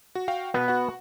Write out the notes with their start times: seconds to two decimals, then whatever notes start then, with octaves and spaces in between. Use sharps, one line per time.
0.15 F#4
0.28 F#4 F5 G5
0.54 B2 B3 B4
0.68 F#4 F#5